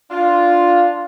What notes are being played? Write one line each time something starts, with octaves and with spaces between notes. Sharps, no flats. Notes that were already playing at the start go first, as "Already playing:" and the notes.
D4 F4